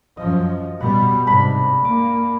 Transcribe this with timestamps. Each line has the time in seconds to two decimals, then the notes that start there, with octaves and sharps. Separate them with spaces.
0.17 F#2 F3 D#5
0.80 B2 G3 B4 F#5
1.27 G#2 C3 D4 A#4 B5
1.85 A#3 D6